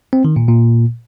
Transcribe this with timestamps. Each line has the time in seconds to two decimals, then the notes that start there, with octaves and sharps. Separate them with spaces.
0.13 C4
0.25 D#3
0.36 A#2
0.48 A#2